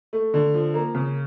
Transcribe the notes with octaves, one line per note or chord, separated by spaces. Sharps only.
A3
D3
F3
A#3
C#3